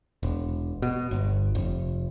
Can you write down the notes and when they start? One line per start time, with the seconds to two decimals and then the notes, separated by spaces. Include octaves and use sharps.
0.23 E1
0.82 B2
1.11 G1
1.55 F1